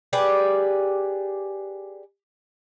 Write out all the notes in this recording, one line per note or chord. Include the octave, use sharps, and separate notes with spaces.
G4 G#4 B4 D5